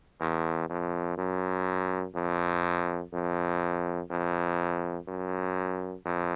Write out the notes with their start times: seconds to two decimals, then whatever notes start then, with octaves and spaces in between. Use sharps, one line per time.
0.21 E2
0.69 F2
1.18 F#2
2.15 F2
3.13 F2
4.11 F2
5.08 F#2
6.05 F2